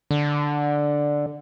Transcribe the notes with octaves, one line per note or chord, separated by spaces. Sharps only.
D3